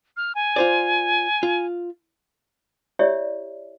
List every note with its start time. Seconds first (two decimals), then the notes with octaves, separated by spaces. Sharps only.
0.17 F6
0.35 G#5
0.56 F4 C5 D5
1.43 F4
2.99 E4 G4 C#5 D5 E5